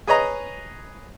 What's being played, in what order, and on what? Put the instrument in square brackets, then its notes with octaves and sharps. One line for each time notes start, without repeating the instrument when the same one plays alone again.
[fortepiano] G#4 B4 C#5 D#5 A#5